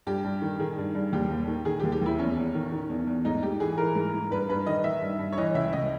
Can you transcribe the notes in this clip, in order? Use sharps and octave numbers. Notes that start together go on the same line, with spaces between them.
G2 G4
G2
D#3
D#3 G#4
G2
G2
D#2 G4
D#2
D#3
D#3 G#4
G4
D#2
G4
D#2 E4
E2 C#4
E2
D#3
D#3
E2
E2
G#2 D#4
G#2 G4
E3 G#4
E3 A#4
G#2
G#2
G2 B4
G2 B4
D#3 D#5
D#3 E5
G2
G2
C#5
E3 D#5
C#2 E5
C#2 D#5